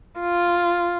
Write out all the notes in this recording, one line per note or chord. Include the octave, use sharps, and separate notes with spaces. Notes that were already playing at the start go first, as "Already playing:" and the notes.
F4